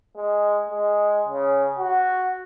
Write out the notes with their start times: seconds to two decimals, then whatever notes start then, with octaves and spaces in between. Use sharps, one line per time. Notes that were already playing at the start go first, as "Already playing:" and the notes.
0.16 G#3
0.69 G#3
1.28 C#3
1.79 F#4